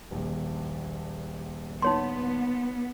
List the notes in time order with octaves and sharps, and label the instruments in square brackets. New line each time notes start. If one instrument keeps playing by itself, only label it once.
[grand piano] D#1 A#1
[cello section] B3 [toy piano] D#4 C#5 C6